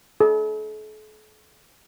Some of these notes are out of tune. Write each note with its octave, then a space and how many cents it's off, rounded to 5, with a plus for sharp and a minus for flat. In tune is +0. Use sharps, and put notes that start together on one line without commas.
A4 -45